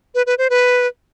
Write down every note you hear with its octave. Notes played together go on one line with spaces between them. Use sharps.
B4
B4
C5
B4